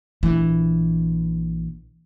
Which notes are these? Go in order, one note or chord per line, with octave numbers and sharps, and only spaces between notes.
A#1 E3